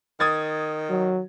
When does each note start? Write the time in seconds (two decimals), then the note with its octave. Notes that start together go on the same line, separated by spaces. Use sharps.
0.20 D#3 D#6 G#6 A6
0.89 F#3